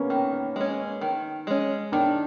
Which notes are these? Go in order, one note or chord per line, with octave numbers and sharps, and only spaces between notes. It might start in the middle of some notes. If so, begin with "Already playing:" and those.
Already playing: A#3 B3 C#4
D#3
G#3 C#4
D#3
G#3 C#4
D#3 D4